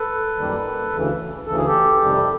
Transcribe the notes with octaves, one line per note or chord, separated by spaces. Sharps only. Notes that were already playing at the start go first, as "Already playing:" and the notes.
Already playing: A4 B4
F#2 D#3 G3 A#3
D2 C#3 E3
D2 C#3 E3 A4
G#4
G4 A4
F2 C3 D#3 G3